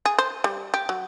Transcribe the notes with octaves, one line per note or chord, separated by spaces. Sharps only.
G#4
C5
G3
G4
F#3